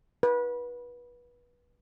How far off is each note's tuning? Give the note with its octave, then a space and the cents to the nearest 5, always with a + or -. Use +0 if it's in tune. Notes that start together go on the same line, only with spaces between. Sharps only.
B4 -25